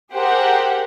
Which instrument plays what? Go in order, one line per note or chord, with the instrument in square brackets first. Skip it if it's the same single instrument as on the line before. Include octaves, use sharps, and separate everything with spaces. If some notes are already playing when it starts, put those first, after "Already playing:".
[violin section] G4 G#4 A#4 C5 F#5